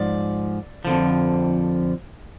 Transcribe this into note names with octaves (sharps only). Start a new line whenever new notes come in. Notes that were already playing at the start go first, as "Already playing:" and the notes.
Already playing: G#2 F3 D5
F2 D3 F3